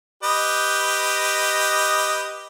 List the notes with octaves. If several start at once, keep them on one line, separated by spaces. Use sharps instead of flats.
G4 B4 D#5